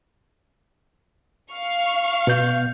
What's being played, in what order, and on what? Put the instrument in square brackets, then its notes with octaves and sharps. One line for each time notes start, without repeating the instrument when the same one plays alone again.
[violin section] F5 C#6 F6
[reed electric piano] B2 B3 G6